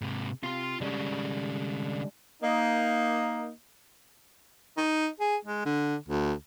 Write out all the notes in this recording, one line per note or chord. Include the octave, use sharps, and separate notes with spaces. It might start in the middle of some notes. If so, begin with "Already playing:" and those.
G#2 C3
C3 F4 C6
D3 G3 G#3 C#4 D4
A#3 D#4
D#4
G#4
G#3
D3
D2